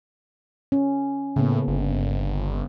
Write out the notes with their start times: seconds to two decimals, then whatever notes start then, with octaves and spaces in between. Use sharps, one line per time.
0.72 C#4
1.36 A2 C#3 A#3 B3
1.67 G1